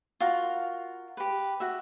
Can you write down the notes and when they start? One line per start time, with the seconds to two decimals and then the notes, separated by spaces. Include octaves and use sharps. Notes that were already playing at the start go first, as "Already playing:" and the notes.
0.20 F4 F#4 A#4
1.17 G4 B4
1.60 F#4 E5